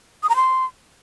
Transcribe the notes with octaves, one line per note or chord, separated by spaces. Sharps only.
D#6
A#5
C6